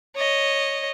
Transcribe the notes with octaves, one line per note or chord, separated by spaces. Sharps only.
C#5 D#5